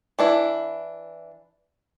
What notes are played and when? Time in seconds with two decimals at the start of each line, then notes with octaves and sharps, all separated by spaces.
0.19 E3 D4 E4